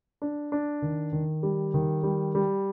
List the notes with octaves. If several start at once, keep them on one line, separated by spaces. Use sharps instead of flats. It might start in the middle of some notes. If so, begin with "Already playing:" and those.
D4
D4
D#3
D#3
G3
D#3
G3
G3